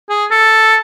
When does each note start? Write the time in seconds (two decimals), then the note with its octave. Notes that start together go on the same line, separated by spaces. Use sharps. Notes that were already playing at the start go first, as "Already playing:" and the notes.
0.09 G#4
0.31 A4